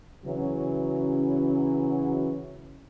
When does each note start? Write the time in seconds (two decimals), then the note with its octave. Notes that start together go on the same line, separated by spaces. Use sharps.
0.25 C#3 E3 F#3 C#4